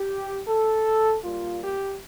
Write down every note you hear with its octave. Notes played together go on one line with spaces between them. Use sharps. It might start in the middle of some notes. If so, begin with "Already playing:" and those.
Already playing: G4
A4
A#2 G3 A#3 F4
G4